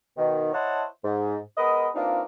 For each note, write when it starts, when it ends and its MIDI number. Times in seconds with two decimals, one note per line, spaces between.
0.17 0.50 47
0.17 0.50 51
0.53 0.84 64
0.53 0.84 72
0.53 0.84 73
0.53 0.84 75
0.53 0.84 78
0.53 0.84 81
1.04 1.37 44
1.57 1.88 56
1.57 1.88 59
1.57 1.88 70
1.57 1.88 71
1.57 1.88 75
1.95 2.21 52
1.95 2.21 58
1.95 2.21 60
1.95 2.21 62
1.95 2.21 63
1.95 2.21 65